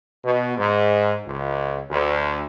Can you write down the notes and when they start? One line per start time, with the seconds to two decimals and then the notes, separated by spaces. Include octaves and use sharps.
0.25 B2
0.57 G#2
1.26 C#2
1.91 D2